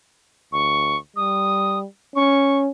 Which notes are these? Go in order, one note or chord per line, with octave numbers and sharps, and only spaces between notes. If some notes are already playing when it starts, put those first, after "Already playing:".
D2 C#6
G3 D#6
C#4 C#6